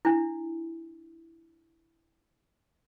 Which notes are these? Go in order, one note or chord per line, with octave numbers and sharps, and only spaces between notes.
D4 E4